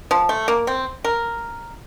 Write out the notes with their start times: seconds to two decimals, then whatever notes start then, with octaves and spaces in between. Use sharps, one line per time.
0.11 F3
0.29 A3
0.48 A#3
0.67 C4
1.04 A#4